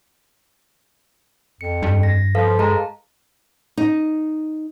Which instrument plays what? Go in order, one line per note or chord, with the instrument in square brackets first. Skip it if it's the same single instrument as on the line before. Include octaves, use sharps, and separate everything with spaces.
[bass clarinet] F2 [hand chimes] C#7
[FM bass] G2
[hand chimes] A#6
[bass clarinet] F3 [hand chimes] A4 B4 F5
[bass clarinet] G#3 [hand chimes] G#4 A5 A#5
[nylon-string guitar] D#4